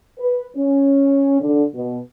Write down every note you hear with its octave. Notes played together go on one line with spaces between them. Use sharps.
B4
C#4
D3
B2